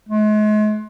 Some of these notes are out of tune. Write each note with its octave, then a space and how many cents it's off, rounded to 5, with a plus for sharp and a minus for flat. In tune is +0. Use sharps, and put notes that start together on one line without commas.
G#3 +40